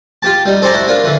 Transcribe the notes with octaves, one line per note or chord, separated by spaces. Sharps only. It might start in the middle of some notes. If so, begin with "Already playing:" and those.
F4 G4 A5
G3 D#4
A4 C5 D5 G#5 A#5
E4 F#4
D4 F4 A#4
D3 E3